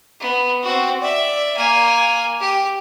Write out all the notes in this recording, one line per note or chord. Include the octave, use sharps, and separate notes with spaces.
B3
C4 F#4
D5 E5
A#3 G#5
G4